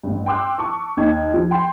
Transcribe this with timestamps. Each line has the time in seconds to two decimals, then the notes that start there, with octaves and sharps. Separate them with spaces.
0.03 A1 G2
0.26 G5 C6 D6 E6 F#6
0.58 A5 C#6 D6
0.97 D#2 D#4 G#6
1.34 F3
1.51 G5 C6